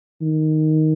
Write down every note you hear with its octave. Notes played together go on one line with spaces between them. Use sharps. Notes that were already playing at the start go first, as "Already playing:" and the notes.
D#3